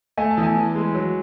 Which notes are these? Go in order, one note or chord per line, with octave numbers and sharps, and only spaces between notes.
A3 G#5
A5
E2
G#5
E3
G#3
F#3